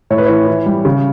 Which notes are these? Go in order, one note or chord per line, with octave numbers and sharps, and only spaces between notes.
A2 C#5
B4
E3 C#5
E3
G3
C#3